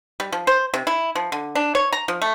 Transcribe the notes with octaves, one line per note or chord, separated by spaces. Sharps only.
G3
F3
C5
C3
E4
F3
D3
D4
C#5
A#5
F3
A3